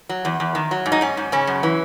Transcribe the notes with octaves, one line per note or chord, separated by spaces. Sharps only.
F#3
E2
E2
D#3
F#3
G#2
D#4
G#2 C#4
G#2
C#3 C#4
F#2
E3